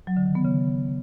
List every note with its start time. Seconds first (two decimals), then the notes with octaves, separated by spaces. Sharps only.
0.07 F#3
0.17 D3
0.26 D#3
0.35 B3
0.45 C#3